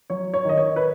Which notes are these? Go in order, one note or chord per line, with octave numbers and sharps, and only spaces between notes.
F#3 C#5
C#5
D#3 D#5
C#5
B4